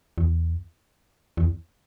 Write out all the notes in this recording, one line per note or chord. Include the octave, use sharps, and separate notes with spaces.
E2
E2